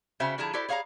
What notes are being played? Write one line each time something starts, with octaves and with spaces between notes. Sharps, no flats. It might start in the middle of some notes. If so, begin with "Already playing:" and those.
C#3 F#4 C5 E5 G5
D3 F3 E4 G#4 A5 A#5
E4 F#4 G4 A4 C5 D5
G#4 C#5 F5 A5 A#5